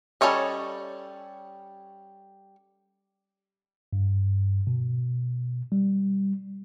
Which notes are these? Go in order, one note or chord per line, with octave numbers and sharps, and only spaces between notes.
G3 C#4 A4 C#5 D#5
G2
B2
G3